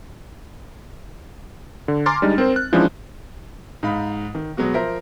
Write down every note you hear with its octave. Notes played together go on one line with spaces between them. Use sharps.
D3
G#5 A#5 C6 D6 F6 A6
G3 G#3 D4 D#4
C4 A#4 C5
F#6
E3 F3 G#3 C#4 D4 E4
G#2 D#4 F5 B5
D#3
B2 F#3 G#3 B3 F#4
F3 A#4 C5 E5 A#6